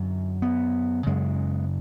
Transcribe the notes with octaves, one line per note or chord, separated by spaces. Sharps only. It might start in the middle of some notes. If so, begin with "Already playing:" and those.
Already playing: F#2 D3
B3
F#2 C#3 G#3